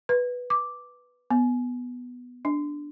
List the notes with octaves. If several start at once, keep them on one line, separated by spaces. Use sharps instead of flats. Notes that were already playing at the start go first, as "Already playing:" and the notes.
B4
D6
B3
D4